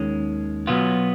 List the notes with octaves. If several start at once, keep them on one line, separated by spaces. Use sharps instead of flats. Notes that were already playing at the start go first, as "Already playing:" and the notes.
Already playing: D#2 D#3 G#3 C#4
B2 F#3 B3 F4